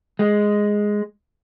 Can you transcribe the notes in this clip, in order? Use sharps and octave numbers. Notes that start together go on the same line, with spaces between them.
G#3